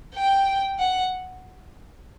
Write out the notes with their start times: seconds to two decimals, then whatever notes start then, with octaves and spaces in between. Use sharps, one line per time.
0.15 G5
0.79 F#5